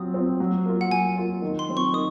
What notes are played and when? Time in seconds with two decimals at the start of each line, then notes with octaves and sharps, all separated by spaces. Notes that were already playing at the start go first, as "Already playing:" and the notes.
Already playing: F#3 C4 F4 D#6
0.14 C4 F4
0.40 F#3
0.66 A#3 F4
0.81 F#5
0.90 F#3 G#5
1.16 A#3 F4
1.42 D#3
1.59 C6
1.68 F#3 C4 F4
1.77 C#6
1.93 D#3 D#6